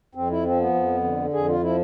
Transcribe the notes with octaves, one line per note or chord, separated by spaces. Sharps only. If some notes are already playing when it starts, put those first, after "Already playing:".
F2 C4
E4
F3 C4
B3
F2
D3
F2 G#4
F4
F3 E4